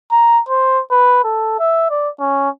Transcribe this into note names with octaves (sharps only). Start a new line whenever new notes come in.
A#5
C5
B4
A4
E5
D5
C#4